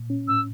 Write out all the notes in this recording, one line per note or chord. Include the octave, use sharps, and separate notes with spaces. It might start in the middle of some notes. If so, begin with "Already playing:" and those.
Already playing: A#2
C#4
A2 E6